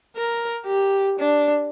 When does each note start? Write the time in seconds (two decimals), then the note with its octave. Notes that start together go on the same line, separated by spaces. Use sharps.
0.16 A#4
0.66 G4
1.19 D4